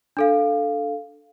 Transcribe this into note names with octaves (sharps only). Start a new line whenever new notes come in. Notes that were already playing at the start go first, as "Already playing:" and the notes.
D4 A4 F5